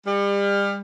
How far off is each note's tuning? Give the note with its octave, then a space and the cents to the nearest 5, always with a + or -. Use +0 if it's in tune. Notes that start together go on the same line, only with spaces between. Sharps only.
G3 +35